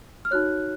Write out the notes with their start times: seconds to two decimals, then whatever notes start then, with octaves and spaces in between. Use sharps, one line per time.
0.25 F6
0.31 D#4 F#4 C#5 F#6